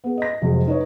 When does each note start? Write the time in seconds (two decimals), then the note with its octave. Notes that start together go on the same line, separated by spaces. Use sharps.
0.04 B3 G#4
0.18 D#5 A#6
0.42 F2 C3 F#3 G#3
0.67 D#4 B4 C#5 D#5